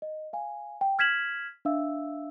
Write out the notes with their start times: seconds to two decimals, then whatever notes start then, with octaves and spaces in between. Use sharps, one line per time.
0.02 D#5
0.33 F5 G#5
0.81 G5
0.99 F6 G#6 B6 E7 F#7
1.65 D4 E5 F5 E6